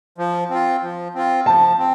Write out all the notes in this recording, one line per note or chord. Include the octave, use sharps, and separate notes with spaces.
F3
C4 F4
F3
C4 F4
F3 A5
C4